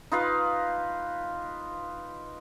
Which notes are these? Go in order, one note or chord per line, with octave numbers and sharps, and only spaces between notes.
D#4 F4 B4 F5